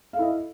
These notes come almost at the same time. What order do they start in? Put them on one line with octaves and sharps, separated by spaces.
F5 A4 E4 D#5